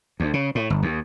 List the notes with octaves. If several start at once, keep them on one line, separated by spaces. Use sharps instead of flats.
D2
C#3
A2
G1
D#2